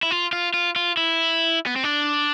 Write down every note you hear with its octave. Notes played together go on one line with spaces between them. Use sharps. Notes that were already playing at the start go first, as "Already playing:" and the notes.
E4
F4
F4
F4
F4
E4
B3
C4
D4